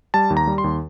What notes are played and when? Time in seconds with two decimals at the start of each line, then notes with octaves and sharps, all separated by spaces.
0.14 G3 A5
0.30 D#2
0.37 A#5
0.47 G3
0.58 C6
0.64 D#2